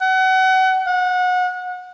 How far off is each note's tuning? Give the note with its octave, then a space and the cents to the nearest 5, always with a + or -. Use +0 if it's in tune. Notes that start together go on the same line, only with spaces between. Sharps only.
F#5 +30
F#5 -25